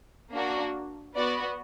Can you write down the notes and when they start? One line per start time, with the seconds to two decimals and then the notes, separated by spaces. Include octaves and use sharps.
0.32 A#3 D4 F#4
1.16 B3 F#4 D5